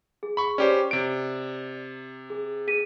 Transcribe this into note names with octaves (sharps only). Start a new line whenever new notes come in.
G#4
B5 C#6
C#4 G4 C5 D5
C3 D7
G#4
G#4 B6 D#7